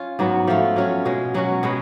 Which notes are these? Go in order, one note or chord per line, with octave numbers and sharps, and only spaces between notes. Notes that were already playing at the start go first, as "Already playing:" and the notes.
Already playing: C#4 F4
G#2 F#3 B3 F#4
F3 A3 F4
F#3 C#4 F4
B2 G#3 C#4
B2 F#3 C#4 F#4
B2 G#3 B3